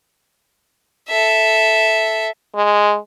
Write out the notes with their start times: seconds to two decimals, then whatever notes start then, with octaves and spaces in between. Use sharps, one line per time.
1.09 A4 E5
2.55 G#3